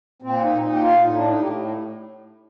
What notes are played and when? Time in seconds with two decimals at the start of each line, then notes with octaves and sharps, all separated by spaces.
0.22 A#2 C4
0.43 D#4
0.62 A#2 D#4
0.72 G4
0.82 F4
1.01 A2 D#4
1.15 D4
1.28 D#4
1.41 A2 G4